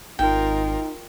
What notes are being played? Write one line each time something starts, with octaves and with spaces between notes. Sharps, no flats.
G#1 D#4 F4 A#4 G5